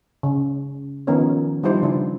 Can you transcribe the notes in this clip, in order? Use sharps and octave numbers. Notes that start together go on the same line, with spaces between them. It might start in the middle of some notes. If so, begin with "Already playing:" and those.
C#3
D#3 F3 B3 C#4 A#4 C#5
F3 G3 D#4 E4 C5
C#3 D4 E4